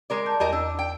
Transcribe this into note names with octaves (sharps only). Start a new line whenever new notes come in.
G#3 A#4 D5
A5 G6
E2 G3 A#4 D#5
D4 E6
G5